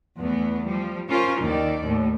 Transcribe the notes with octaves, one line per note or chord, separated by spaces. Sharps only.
E2 A3 B3
F3 G3
C#4 F4 A#4 C5
D#2 D#3 D5
D#2 A2